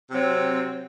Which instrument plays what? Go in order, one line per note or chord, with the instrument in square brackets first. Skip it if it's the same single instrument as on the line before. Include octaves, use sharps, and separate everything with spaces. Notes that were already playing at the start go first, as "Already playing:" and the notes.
[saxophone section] C3 F#3 C4